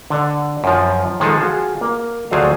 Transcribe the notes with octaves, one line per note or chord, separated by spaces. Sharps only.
D3 D5 F#5
F#2 F3
D#3 F3 G#3 G#4 A4
F4 F#4 G#4
A#3
D2 F3 F#3 G#4 F5 A#5